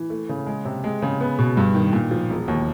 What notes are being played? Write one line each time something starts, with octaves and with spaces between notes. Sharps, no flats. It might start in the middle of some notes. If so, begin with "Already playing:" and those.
Already playing: E3
A3
C#3
G#3
C3
G#3
C#3
B3
B2
G2
D#3
A#2
F3
E1
D#2